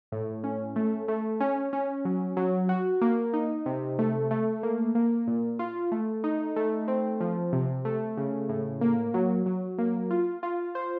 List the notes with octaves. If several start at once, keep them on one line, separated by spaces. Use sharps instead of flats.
A2
C#4
A3
A3
C#4
C#4
F#3
F#3
F#4
A#3
D#4
C3
A3
A3
A#3
A#3
A#2
F4
A3
D#4
A3
C4
F3
C3
A3
C#3
A2
A#3
F#3
F#3
A#3
F4
F4
C5